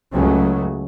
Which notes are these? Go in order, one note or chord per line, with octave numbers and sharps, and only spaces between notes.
C#2 C#3 F#3 A3